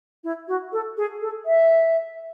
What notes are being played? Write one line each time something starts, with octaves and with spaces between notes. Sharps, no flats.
E4
F#4
A4
G#4
A4
E5